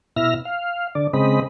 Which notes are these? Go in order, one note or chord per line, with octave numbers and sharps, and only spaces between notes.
B2 E4 E5 F6 A#6
F5
D3 D5
C#3 G#3 C4 D#5 B5